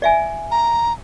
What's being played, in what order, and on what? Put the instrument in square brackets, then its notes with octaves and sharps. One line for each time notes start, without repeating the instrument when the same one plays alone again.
[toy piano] D5 E5 G#5
[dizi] A#5